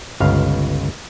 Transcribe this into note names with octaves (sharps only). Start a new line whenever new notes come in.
G1 C#2 F5